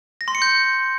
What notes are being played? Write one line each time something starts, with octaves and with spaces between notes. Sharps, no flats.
A#6
C6
C#7
G6